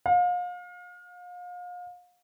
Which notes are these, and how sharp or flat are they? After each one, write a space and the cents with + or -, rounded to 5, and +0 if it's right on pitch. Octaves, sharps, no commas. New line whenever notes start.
F5 +35